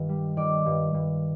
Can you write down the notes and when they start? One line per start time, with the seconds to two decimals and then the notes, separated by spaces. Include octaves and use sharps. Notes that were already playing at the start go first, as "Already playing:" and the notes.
Already playing: G2 D#3
0.09 G3
0.37 D#3 D5
0.66 G2
0.94 G2